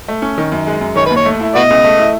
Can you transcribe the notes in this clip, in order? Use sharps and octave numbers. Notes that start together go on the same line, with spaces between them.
A3
C#4
D#3
F#2
G#3
F#2
D#3 C#5
D#2 B4
C#5
A3
E4
B2 F#4 B4 D#5
C#2
A3
E4